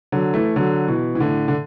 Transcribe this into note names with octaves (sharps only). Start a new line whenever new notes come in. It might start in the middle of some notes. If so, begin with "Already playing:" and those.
D3 F#3
E3 A3
D3 F#3
B2 E3
E3
A2 D3
D3